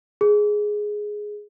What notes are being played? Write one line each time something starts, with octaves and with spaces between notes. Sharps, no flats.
G#4